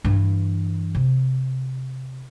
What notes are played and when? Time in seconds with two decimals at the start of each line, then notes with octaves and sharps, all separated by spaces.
0.04 G2 E3
0.95 C3